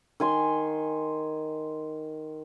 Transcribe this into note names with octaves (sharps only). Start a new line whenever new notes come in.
D#3 G#5 C6